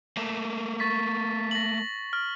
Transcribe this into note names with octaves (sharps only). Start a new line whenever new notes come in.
A3 A#3
C#6 A6 B6
A#6 F#7
F6